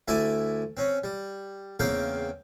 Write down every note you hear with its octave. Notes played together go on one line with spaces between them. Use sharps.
D2 E4 D5 E5 G#5
C4 C#4
G3
E2 C#3 A#3 C4 F5 G5